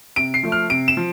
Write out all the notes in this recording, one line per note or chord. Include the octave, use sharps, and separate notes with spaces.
C3 D7
C7
F3 A3
F6
C3 D7
E7
F3